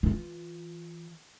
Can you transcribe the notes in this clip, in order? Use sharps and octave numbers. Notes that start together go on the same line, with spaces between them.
E3 F4